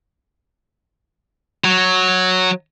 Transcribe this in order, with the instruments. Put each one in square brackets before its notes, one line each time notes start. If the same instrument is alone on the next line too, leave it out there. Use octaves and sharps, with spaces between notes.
[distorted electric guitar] F#3